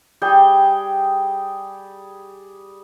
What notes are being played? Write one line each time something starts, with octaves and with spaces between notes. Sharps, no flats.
G3 G#4 G5